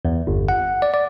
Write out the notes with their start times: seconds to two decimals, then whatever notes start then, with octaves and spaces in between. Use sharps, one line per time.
0.05 E2
0.27 G1
0.49 F#5
0.82 D5
0.94 D5